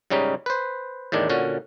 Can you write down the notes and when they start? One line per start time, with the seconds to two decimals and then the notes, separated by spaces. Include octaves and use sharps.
0.10 G#2 C#3 G3 C#4 D#4
0.46 B4 C5
1.12 E2 A2 D#3 D4
1.29 A#2 D3 C#4 F#4